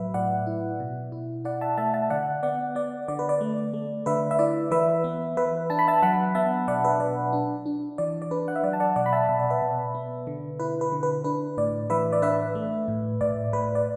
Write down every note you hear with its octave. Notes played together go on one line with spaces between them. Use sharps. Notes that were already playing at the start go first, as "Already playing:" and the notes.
Already playing: A2 F#3 B4 E5
A2 D5 F#5
E4
B2
E4
E4 D5 F#5
E5 A5
A3 E5 A5
E5 A5
D3 D5 F#5
B3 D5 F#5
B3 D5
D3 D5
B4
D5
A3
A3
D3 B4 E5
E5
E4 D5
E3 B4 E5
B3
E3 B4 E5
D4 A5
B5
E5 A5
F#3 F#5 B5
B3 E5 A5
B2 D5 F#5
B4 E5
B2 D5
D4
D4
E3 D5
D5
D4 B4
F#5
E5
F#3 D5
A5
D5 F#5
B2 D5 F#5
B5
E5 A5
B2 E5
D5
B4 E5
B2
B3
D3
E4 B4
B4
D3
B4
D4 B4
A2 D5
E3 B4 E5
D5
D4 B4 E5
A3
A2
A2 D5
A2 B4
D5